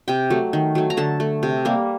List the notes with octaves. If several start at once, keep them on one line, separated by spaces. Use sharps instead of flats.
C3 G5
F#3 A3
D#3
F#3 A3
A#5
D3 A5
A3
C3
G3 A#3